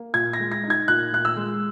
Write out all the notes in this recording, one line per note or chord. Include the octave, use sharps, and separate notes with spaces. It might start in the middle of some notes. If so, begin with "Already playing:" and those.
Already playing: A#3
A#2 G#6
A#6
G#3
A#6
D#4
G#6
A#2 F#6
A#2 F#6
E6
G#3